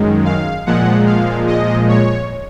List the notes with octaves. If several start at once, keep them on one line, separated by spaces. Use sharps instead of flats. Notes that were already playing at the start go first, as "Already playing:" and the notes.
Already playing: F#2 D#3 G#3
F5
A#2 F3 G#3 F#5
F5
D#5
C#5